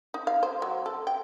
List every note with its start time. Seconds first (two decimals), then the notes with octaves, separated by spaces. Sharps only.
0.14 D#4
0.27 F5
0.43 C5
0.62 F#3
0.86 A4
1.07 G5